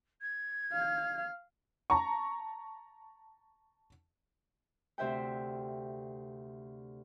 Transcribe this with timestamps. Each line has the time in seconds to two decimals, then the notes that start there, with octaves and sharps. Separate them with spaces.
0.22 G#6
0.73 F5
1.90 A5 A#5 C#6
4.98 D2 C3 C5 E5 G5